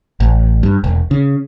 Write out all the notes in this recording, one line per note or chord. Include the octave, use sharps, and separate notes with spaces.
A1
G2
E1
C#3